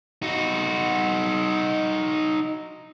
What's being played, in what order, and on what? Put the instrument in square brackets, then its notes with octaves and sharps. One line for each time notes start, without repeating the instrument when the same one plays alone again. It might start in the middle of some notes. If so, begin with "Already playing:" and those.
[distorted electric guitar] D#4 F#4